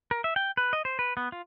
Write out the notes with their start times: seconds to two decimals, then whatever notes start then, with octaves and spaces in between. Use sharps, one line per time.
0.11 A#4
0.24 E5
0.36 G5
0.57 B4
0.73 D#5
0.85 C5
0.99 B4
1.17 B3
1.32 F4